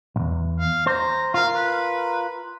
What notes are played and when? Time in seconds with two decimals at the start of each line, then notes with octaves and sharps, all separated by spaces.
0.16 B1 E2
0.59 F5
0.87 C5 A#5
1.34 F4 A#4 F5
1.55 B4